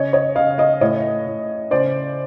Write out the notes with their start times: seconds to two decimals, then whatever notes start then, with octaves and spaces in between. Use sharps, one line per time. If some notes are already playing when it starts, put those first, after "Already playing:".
Already playing: C#3 C#5 D#5
0.13 C#5 D#5
0.36 C#3 D#5 F5
0.58 D#5 F5
0.81 A2 C#5 D#5
1.27 A2
1.71 C#3 C5 D5